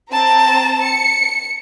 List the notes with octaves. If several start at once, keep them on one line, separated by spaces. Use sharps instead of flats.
C4 A5 A#5
C#7